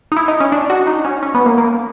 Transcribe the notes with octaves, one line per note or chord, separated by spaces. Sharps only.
D#4
E4
D#4
C#4
D4
F#4
D#4
C#4
C#4
B3
A#3
A#3